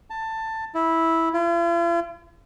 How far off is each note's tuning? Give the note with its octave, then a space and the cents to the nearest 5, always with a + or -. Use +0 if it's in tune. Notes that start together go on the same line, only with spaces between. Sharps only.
A5 +15
E4 -10
F4 -45